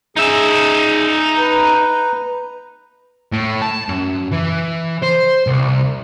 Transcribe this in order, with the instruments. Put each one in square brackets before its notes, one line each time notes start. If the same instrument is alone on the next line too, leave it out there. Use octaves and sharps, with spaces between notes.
[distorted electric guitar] D#4 E5 [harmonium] G#4
[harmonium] B4 A#5
[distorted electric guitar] A2
A5
F#2
E3
C5
C2